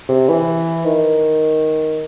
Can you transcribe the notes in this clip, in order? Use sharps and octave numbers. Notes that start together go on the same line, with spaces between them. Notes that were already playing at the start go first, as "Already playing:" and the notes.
C3
E3
D#3